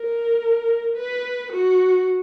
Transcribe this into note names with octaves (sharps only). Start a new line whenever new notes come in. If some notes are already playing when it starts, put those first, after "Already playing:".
Already playing: A#4
B4
F#4